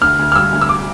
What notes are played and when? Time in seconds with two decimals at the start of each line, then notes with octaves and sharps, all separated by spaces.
0.01 D2 F6
0.19 D2
0.32 F6
0.36 G3 E6
0.52 D2
0.61 E6
0.69 D6